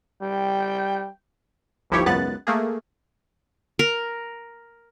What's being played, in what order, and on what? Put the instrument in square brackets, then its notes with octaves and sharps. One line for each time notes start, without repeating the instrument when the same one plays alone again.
[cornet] G3 [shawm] G5
[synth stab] G1 D#2 F3 E4 G4 C#5
G#1 C#2 F#2 B3 F#6 A6
A3 A#3 G#4
[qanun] A#4